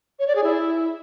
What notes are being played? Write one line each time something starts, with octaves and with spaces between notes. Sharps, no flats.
C#5
D5
G#4
E4